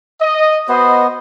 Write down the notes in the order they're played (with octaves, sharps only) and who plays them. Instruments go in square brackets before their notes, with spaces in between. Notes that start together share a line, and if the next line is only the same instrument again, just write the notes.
[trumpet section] D#5
[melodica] B3 [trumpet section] F#4 C5 D#5